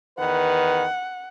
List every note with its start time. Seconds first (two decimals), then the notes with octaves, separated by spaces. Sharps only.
0.19 E2 D#3 B4 F#5